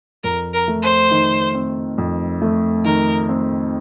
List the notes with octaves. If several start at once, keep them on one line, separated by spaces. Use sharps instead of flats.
F2 A#4
A#4
A3
C5
D#3
C4
F2
A3
D#3 A#4
C4